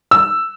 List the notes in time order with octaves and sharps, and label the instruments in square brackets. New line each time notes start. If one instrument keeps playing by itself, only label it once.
[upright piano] E6